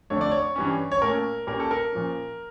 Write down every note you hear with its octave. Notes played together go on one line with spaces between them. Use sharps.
F2 D3 A3 D4 C#5
D5
C#5
G2 E3 G3 C#4
C#5
A#2 A3 C#4 A#4
A#2 G3 A#3 C#4 A#4
A4
A#4
A#2 F3 C#4